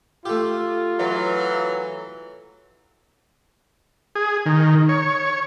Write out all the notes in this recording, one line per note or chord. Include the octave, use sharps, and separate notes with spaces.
A3 F4 G4
E3 F#3
G#4
D#3
C#5